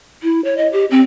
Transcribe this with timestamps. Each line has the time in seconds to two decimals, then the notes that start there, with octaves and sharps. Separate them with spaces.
0.23 E4
0.45 C#5
0.57 D#5
0.73 G4
0.91 C4